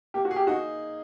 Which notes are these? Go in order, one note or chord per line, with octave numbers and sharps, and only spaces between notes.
A#3 G4
F#4
G#4
G4
D#4 F#4